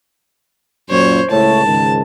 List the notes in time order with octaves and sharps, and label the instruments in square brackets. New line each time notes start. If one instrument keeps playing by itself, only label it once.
[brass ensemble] F#2 A#2 [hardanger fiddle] C5 C#5
[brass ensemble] C#2 A2 C#5 [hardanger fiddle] A5
[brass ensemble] C#2 G#2 D#3